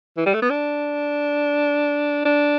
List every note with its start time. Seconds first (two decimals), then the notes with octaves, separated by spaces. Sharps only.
0.17 E3
0.26 G3
0.34 A3
0.42 B3
0.50 D4
2.25 D4